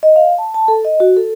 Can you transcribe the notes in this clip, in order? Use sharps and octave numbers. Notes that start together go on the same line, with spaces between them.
D#5
F5
A5
A5
A4
D#5
F#4
A4